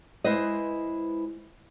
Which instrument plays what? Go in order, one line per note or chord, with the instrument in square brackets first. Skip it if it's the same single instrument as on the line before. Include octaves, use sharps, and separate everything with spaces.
[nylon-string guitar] G#3 E4 B4 C5 D#5